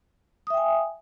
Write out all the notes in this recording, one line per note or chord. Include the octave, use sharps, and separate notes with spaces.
E5 G5 G#5 D#6